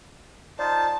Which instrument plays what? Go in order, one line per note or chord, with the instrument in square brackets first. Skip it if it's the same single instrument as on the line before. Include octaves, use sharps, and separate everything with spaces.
[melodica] D#4 F4 C5 [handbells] D5 [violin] A5